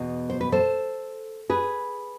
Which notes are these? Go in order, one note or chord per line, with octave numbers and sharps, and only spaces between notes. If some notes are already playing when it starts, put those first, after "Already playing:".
Already playing: E2 B2
C5
B4
A4 C5
G#4 B4